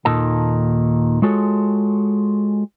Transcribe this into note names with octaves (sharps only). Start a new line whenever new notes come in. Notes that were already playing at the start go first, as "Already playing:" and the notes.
D#2 A#2 D#3 D#4 A4 A5
G#3 F4 F#4 G#4 A4 C#5